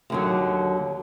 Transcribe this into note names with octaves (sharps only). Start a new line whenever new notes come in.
D#2 D3 F#3